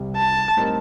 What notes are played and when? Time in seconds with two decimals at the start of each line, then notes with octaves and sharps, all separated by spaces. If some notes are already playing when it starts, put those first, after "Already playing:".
Already playing: C2 C3 G3
0.17 A5
0.57 A2 G3 C4 D#4 A#4